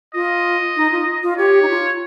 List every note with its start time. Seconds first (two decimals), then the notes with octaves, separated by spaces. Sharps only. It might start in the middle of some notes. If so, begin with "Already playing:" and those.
0.14 F4 D#5
0.76 D#4
0.92 F4
1.23 F4
1.38 G4 C#5
1.62 D#4
1.69 F4